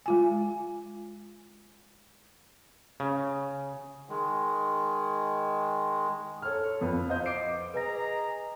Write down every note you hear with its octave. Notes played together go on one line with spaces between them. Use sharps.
G#3 F4 G#5
C#3
D#3 G#3
A4 C#5 F6
F2 B4
C5 D#5 F5 G6
D6 C7 D7
G#4 B4 D#5 A#5 A#6